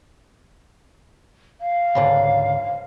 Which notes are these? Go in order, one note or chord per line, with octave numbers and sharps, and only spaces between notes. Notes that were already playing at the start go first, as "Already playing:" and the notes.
F5
C#2 G#2 D3